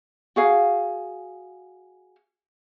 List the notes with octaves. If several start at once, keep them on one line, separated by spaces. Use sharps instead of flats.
F#4 G#4 F5